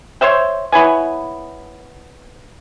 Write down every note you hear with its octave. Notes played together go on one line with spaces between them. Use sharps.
C5 C#5 E5 G5
B3 E4 C#5 G#5